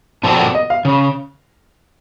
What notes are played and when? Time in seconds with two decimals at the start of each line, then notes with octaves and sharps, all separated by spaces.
0.23 A#2 F3 C4 F#4 A4 A5
0.39 F#5
0.55 D#5
0.70 F5
0.85 C#3